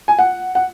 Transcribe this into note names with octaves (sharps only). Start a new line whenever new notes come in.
G#5
F#5
F#5